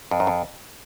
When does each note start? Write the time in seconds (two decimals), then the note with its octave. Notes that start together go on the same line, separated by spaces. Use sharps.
0.11 F2
0.20 F#2
0.27 F2